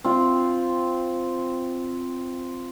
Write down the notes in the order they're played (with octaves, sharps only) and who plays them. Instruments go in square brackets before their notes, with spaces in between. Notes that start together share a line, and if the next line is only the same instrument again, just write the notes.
[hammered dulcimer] C4 F4